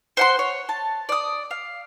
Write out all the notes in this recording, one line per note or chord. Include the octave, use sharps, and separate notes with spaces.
C5 F#5 C6
C#5
A5
D5 D#6
F5